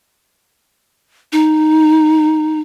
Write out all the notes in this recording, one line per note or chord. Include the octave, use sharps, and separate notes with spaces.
D#4